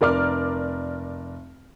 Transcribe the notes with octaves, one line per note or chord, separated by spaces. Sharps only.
F1 A#4 D5 D6 F6